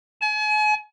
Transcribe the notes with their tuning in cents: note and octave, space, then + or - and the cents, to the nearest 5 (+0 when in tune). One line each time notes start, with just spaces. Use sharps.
G#5 +40